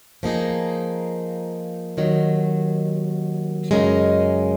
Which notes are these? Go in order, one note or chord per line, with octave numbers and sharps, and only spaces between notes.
F3 A#3 D#4 G#4
D#2 D#3 F#3
F#2 C#3 G#3 D#4 A#4